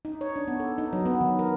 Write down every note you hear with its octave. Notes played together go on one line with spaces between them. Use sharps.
D#4
C#5
D4
B3
A4
D#4
F#3
B3
D#3
A#4